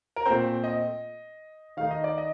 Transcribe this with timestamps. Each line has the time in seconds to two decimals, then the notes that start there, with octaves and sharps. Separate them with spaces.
0.16 A#4
0.26 A#2 A3 C4 C5
0.64 D#5
1.77 D#3 A3 D#4 F5
1.91 D#5
2.04 D5
2.18 D#5